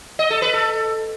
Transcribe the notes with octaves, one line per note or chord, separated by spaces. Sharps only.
D#5
A4
B4
A4